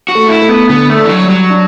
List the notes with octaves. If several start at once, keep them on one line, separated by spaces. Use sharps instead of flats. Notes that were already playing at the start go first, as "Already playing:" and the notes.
F#4
A3
E4
A3
B3
D3 B3
A3
D4
E3
F#3
G3
F#3
D4